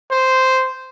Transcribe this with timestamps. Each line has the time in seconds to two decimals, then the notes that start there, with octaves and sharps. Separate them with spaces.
0.11 C5